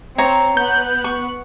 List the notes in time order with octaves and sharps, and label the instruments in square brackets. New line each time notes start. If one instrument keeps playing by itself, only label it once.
[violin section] C4 [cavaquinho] C#5 A#5
[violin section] B3 F#6 [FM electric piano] G6
[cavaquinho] C#6